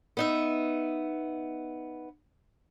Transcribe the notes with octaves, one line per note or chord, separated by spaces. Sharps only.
B3 D#4 E5